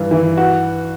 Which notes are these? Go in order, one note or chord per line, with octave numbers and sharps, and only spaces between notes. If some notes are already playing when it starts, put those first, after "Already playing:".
Already playing: G2 E3
E3
F#4